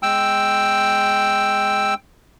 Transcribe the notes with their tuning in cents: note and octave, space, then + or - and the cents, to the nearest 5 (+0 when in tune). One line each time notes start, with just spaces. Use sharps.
G#3 +0 G5 +0 E6 +0